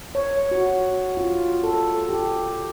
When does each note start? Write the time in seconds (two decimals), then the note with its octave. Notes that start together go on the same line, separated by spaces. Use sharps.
0.15 C#5
0.51 F#4
1.17 F4
1.64 A4
2.09 G4